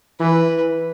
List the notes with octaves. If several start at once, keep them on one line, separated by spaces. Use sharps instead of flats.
E3 B4